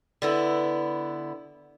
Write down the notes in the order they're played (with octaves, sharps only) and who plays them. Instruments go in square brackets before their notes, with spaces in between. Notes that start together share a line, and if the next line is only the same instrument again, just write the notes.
[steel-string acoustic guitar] D3 B3 E4